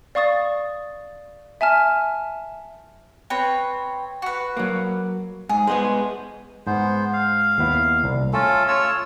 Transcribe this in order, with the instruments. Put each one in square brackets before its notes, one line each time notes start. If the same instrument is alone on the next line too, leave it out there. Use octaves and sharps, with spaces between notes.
[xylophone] D5 F5 C#6 D#6 A6
E5 G#5 A5 F6
[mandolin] C4 B4 C#5
F#4 B4
[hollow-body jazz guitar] F#3 A#3
[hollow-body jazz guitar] G#2 [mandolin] G#4
[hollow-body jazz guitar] G#3 B3 G#4 [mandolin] C5
[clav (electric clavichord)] G#2 [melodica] B3 C5
[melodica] F5
[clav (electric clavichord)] D#2 B3 E4
C2
[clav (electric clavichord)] A3 [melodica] C#4 F4 A4
[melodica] F4 C#5 E6